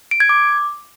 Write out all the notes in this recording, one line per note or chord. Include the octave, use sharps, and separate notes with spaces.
D7
G#6
D6